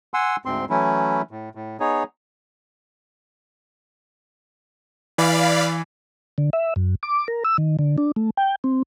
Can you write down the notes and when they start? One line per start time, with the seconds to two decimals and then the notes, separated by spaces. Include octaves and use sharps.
0.14 F#5 G#5 C6 E6
0.45 D2 G#2 C4 C6
0.70 E3 F#3 A3 C#4 E4
1.31 A2
1.55 A2
1.80 B3 D#4 G#4 C#5
5.18 E3 D5 F5 B5
6.38 D3
6.53 E5
6.76 F#2
7.03 D6
7.28 A#4
7.45 E6
7.58 D#3
7.79 D3
7.98 D4
8.16 A3
8.37 G5
8.64 C4